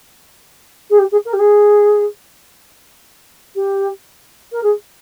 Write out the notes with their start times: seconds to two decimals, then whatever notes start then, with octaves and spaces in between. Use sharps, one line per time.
0.90 G#4
0.98 G4
1.11 G#4
1.25 A#4
1.33 G4
1.39 G#4
3.55 G4
4.52 A#4
4.63 G#4